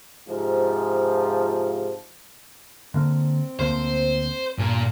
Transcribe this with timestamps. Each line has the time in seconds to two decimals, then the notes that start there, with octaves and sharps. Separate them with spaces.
0.28 G#2 C3 F3
2.94 D3 A#3 C4
3.59 D2 A#3 C5
4.58 G2 A#2